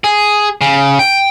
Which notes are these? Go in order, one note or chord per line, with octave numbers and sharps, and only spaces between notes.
G#4
C#3
G5